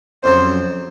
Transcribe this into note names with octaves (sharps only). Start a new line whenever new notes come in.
F2 C#3 F#3 C5